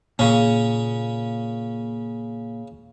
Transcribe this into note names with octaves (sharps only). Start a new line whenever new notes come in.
A#2 C#3 C#4